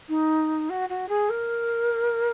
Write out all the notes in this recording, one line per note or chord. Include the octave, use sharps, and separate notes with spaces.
D#4
F#4
F#4
G#4
A#4